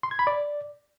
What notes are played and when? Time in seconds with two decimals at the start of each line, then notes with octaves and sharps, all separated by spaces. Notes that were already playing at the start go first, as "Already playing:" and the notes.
0.03 C6
0.11 G#6
0.19 B5
0.27 D5